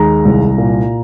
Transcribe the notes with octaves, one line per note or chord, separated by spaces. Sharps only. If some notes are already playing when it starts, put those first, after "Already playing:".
Already playing: D#2 G#3 A#5
C2
A#2